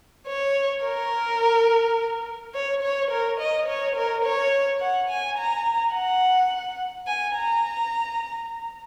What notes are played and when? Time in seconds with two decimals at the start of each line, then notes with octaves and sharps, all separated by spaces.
0.27 C#5
0.85 A#4
2.54 C#5
2.83 C#5
3.11 A#4
3.40 D#5
3.68 C#5
3.96 A#4
4.25 C#5
4.81 F#5
5.10 G#5
5.38 A#5
5.95 F#5
7.07 G#5
7.36 A#5